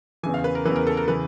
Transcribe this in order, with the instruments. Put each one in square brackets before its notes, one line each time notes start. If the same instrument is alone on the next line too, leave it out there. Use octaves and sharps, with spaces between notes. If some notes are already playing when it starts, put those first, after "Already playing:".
[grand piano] E2 C#3 E3 [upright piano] G#5
[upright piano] F5
B4
A#4
[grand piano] E2 C#3 E3 [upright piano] B4
[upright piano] A#4
A4
A#4
[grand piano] C#3 E3 [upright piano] B4